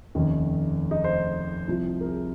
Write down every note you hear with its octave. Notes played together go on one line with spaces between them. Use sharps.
F1 D#2 D#3 C#4
D#4
C5
C2 C3 F3
A#4
G#4